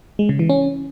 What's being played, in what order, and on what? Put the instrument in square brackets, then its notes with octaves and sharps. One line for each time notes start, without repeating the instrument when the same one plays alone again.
[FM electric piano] G#3
C#3
E3
C#4